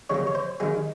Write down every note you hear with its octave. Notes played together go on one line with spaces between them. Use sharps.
C#3 G3 A#3 C#5
C#5
C5
D#3 G3 A#3 G#4